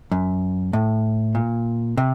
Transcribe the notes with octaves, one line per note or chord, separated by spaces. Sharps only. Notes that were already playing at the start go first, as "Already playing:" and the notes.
F#2
A2
A#2
C3